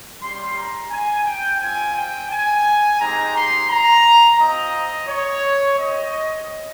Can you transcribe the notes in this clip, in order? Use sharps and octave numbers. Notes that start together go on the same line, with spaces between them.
G3 C#4 G4 C6
A#5
G#5
G5
C4 F4 G#5
G5
G#5
G#3 C4 D#4 G4 A#5
C6
A#5
C4 F4 D#5
C#5
C4 G4 D#5